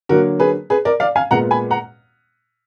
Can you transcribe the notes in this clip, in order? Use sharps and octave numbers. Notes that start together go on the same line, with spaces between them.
D3 F#3 A#3 F#4 A#4
G#4 B4
G#4 B4
A#4 D5
D5 F5
F5 G#5
A#2 G#3 B3 F#5 A#5
G#5 B5
F#5 A#5